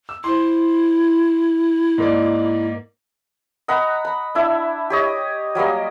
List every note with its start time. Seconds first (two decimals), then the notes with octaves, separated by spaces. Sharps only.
0.09 E6
0.24 E4 C5 C6
1.98 G#2 A#3 D5
3.68 D#5 F#5 A#5 B5
4.05 B5
4.35 D4 E4 E5
4.90 G4 C#5 D#5
5.55 F#3 G3 A#3 D#5